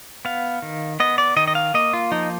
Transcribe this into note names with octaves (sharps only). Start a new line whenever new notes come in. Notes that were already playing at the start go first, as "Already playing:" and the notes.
B3 F5
D#3
B3 D#5
D5
D#3 D#5
D#5
F5
A#3 D#5
F4
F3 D#4